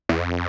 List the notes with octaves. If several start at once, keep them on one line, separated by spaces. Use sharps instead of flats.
E2
F2